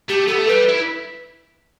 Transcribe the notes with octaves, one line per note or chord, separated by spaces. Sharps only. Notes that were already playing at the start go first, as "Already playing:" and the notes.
A3 G4
B3 A4
A3
G3 B4
E4